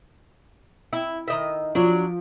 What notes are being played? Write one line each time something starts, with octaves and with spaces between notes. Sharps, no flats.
E4
D#3 D#5 E5
F3 F#3 D4